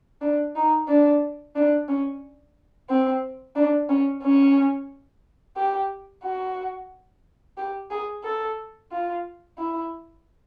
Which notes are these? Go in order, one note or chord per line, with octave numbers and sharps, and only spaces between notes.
D4
D#4
D4
D4
C#4
C4
D4
C#4
C#4
G4
F#4
G4
G#4
A4
F4
E4